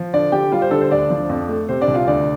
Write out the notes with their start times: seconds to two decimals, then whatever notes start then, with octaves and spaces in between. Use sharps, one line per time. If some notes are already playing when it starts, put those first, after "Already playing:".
Already playing: F3
0.14 D3 D4 D5
0.32 D3 G4 G5
0.52 G3 F4 F5
0.62 C5
0.71 D3 A4
0.81 C5
0.91 D2 D4 D5
1.10 F3
1.29 F2
1.49 A3
1.69 C3 C5
1.81 D4 D5
1.88 C2
1.94 F4 F5
2.07 D2 D4 D5